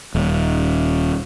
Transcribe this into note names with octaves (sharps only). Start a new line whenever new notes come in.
D#1